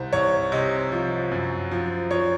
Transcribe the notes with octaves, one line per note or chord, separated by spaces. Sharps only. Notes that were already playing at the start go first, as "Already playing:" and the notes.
Already playing: C2 C5
C2 C#5
C3 D#5
F3
F#2
F3
F3 C#5